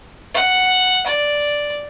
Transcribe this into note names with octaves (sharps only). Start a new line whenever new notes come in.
F#5
D5